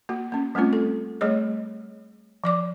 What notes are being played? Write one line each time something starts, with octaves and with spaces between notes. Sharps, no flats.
A#3 F#4
A#3 C#4
G3 A3 C4 C#4 F4
A4
G3 A3 G#4 C#5 D#5
F3 D5 D6